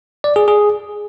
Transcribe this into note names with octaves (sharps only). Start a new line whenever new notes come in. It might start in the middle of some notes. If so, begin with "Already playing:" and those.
D5
G#4
G#4